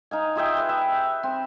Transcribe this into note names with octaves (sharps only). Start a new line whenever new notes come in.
D#4 F5 G#5
F4 G#4 E5 G5
B4 E5
E5
C4